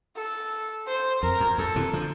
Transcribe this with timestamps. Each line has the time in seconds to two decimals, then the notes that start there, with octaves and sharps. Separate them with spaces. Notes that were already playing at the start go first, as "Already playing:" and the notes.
0.16 A4
0.87 C5
1.23 F2 A#4
1.40 F2
1.58 F2 A4
1.76 C3 E3
1.93 D3 F3